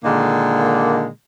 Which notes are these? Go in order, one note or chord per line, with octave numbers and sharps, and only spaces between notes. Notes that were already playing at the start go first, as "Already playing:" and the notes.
A#2 D3 D#3 G#3 A#3